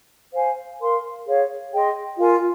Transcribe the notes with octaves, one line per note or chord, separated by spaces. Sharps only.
C5 F5 G#5
A#4 F5 C6
G#4 C#5 F5
G#4 D#5 G5 C6
F4 A#4 F5 G#5